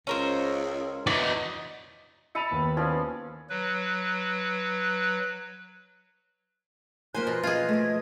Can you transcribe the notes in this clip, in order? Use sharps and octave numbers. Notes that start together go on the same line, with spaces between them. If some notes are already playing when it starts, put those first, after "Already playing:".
C#2 C#4 A#4 C5
E3 E4 F#4 D5 D#5
E5 A5 B5 C#7 D#7 F7
D#2 B3
F3 C#4 D5
F#3 B4
F3 A#3 A#4 C5 G#5 C6 F#6
B2
F4 G#4 D#5 G#6
F3 A3